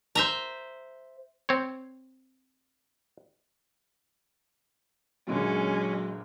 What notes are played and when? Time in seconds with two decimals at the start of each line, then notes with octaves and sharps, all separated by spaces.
0.15 C5 E5 A#5
1.49 C4 C#5
5.28 F#1 A#2 D3 F#3 G#3 C#4